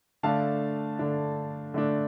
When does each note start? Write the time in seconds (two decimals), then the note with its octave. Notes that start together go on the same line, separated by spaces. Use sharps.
0.23 D3 A3 D4 F5 A5
0.99 D3 A3 D4
1.74 D3 A3 D4